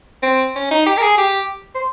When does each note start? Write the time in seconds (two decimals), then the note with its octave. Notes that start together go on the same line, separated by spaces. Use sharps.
0.23 C4
0.56 C#4
0.71 D#4
0.86 G4
0.98 A#4
1.02 G#4
1.18 G4
1.75 C5